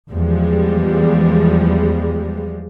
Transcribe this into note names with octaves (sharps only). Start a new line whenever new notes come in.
E2 F3 G3 G#3